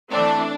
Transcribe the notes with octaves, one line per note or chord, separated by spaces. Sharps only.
E3 A3 C4 D4